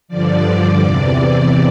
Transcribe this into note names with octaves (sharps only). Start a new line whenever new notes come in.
G2 D3 F3 D5
E2 C3 E3